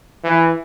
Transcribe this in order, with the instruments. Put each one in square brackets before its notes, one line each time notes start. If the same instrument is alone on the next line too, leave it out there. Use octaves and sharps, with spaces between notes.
[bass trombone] E3